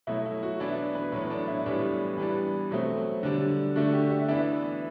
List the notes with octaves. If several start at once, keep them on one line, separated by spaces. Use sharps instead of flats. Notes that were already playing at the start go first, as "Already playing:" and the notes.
B2 F#3 A3 E4
E4
F#4
E3 B3 D4 E4
D4
B4
A2 F#3 B3
D4
E4
A2 E3 G3 B3 D4
E3 G3 B3 D4
B2 F#3 A3 C4
D3 G3 D4
D3 A3 D4 F#4
G4
E5
E3 B3 D4 E5